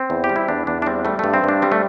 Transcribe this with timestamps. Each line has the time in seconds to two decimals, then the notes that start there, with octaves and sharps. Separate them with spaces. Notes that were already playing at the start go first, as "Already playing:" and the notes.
Already playing: C4
0.10 E2
0.24 G4
0.29 G3
0.36 E4
0.48 E2 D4
0.67 E2 D4
0.82 D4
0.86 G3 C4
1.05 G3 A3
1.19 G2 A3
1.34 C4
1.44 G2 D4
1.62 G3 C4
1.72 A3